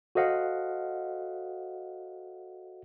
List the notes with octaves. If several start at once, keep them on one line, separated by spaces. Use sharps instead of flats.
F#4 A4 C5 D#5 F5 F#5